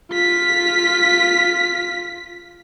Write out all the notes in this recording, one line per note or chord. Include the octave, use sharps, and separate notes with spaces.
F4 B6